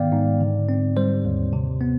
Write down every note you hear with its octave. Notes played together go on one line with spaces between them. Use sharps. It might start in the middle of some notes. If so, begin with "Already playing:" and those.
Already playing: G#2 D#3 B3 D5 F5 G5
G#2
D3
C4
G3 C5
D#2
C3
B3